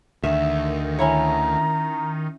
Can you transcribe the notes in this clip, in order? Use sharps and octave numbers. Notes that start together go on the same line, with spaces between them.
D2 D#3 E5
C#4 E4 C#5 A#5